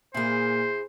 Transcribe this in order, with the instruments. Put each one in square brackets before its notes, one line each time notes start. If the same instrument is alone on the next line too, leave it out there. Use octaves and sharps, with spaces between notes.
[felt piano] A#2 A#3 [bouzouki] E4 G#4 [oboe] C5